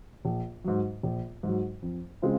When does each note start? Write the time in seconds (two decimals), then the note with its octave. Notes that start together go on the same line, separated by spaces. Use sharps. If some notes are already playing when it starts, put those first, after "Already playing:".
0.25 A#1
0.64 G#2 F#3
1.03 A#1
1.43 G#2 F#3
1.82 F2
2.22 C#3 G#3 C4 F4